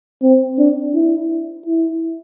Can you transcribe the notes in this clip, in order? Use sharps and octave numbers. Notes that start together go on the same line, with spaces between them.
C4
D4
E4
E4